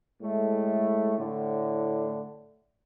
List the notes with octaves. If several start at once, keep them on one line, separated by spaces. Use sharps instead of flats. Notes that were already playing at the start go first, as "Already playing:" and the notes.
A2 G#3 A3
A2 D3